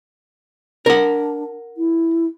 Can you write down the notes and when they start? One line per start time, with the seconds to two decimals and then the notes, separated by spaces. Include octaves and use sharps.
0.86 D4 A#4 F#5
1.77 E4